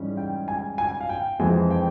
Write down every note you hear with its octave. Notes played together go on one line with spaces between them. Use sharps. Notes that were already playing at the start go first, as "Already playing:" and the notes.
Already playing: G#2 E3 G3 C#4
G5
G#5
G#5
F5
G5
F2 E3 G#3 C4 G#5
G5